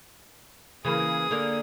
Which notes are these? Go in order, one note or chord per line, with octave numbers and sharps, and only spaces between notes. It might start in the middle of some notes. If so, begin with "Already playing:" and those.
C#3 E3 A#3 G#4 D#6
D3 A#3 D5